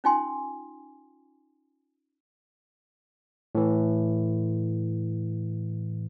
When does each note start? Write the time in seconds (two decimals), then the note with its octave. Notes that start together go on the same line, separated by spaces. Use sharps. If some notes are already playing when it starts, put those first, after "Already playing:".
0.04 C#4 D#4 F4 G5 G#5 C6
3.55 A2 E3